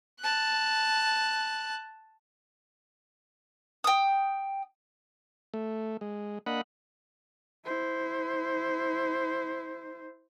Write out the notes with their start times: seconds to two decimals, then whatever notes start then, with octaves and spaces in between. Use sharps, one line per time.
0.19 A5 F#6
3.84 G5 D#6
5.54 A3
6.01 G#3
6.46 A#3 D4 D#5 F#5 B5
7.65 E4 C5